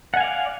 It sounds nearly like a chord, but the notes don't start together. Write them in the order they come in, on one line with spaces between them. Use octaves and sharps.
F#5 G#5 F5 D5